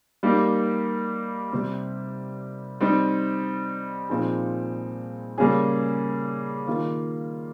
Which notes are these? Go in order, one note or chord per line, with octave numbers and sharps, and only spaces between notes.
G3 A#3 D#4 G4
C3 G3 C4
G3 C4 D#4
A#2 F3 C4 D#4 G#4
C#3 G3 A#3 C#4 G#4
D#3 A#3 F4